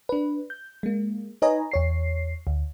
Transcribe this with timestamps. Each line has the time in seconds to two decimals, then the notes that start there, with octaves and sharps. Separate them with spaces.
0.09 D4 B4
0.50 G6
0.83 G#3 A#3
1.42 D#4 B4 C#5 D#5 G#5 A#5
1.71 E2 C#5 C7
2.47 D2